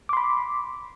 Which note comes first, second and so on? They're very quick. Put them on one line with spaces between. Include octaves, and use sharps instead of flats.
D6 C6 B5